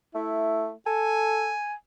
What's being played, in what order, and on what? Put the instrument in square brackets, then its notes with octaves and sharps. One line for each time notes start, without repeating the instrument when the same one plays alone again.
[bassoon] A3 [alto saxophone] E4
[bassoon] A4 [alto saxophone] G#5